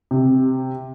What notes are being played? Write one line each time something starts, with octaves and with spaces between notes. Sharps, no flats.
C3